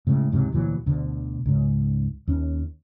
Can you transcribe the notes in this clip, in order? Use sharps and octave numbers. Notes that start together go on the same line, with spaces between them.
A2 C#3 G#3
C#2 G#2 C3 F#3
D2 A#2 E3 F#3
D2 B2 D3
C#2 G#2
D#2 C#4